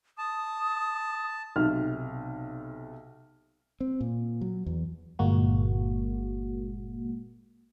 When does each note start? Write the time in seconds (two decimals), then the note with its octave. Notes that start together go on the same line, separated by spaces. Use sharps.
0.18 A5 D#6
1.56 B1 C3 F6
3.81 C4
4.01 A#2
4.41 F#3
4.66 E2
5.19 G1 A#2 G#3 A#3 F#4